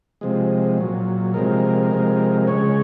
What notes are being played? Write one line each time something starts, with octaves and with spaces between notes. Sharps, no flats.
C3 F3 G#3
A#2 F#3
C3 F3 G#3 A#4
C3 F3 G#3
C#3 G#3 C#5